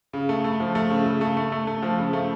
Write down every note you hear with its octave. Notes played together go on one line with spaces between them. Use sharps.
C#3
A3
A3
F3
A3
C#3
C#3
A3
A3
A3
A3
F3
C#3
A3